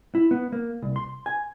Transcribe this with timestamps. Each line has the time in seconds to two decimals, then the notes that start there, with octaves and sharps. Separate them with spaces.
0.15 E4
0.31 B3
0.52 A#3
0.82 C2
0.96 C6
1.26 G#5